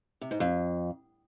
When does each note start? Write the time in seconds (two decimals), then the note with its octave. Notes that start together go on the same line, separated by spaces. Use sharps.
0.21 C3
0.31 G#2
0.40 F2